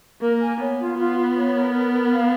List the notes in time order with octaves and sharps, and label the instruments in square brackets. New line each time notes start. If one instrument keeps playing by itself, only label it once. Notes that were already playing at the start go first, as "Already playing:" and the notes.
[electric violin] A#3 [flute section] A#4
[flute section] G#5
[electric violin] B3 [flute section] C#5
[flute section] F4
[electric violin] B3 [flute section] F4
[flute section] F4
C#5
A#4
A#4
A#4
F5